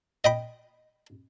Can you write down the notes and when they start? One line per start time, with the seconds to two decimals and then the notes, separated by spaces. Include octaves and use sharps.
0.24 D#5 G5 B5